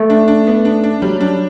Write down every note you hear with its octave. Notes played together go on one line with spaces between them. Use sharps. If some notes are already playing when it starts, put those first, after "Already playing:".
Already playing: A3
D4
D4
B3
D4
D4
F#3 G3
D4